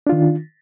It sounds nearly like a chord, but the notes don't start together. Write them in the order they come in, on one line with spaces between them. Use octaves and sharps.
D4 F4 D#3